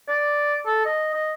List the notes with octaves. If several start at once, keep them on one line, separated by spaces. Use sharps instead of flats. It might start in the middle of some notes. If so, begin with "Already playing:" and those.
D5
A4
D#5
D#5